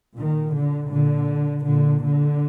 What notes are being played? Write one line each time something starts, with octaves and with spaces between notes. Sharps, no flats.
A#2 D#3
D3
A#2 D3
A#2 D3
D3